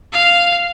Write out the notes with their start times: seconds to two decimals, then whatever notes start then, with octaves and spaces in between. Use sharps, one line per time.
0.13 F5